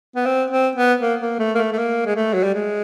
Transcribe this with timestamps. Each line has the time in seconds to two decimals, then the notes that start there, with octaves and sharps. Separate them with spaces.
0.16 B3
0.25 C4
0.50 C4
0.75 B3
1.01 A#3
1.21 A#3
1.39 A3
1.55 A#3
1.58 A3
1.72 A3
1.78 A#3
2.06 G#3
2.16 A3
2.33 F#3
2.43 G3
2.54 G#3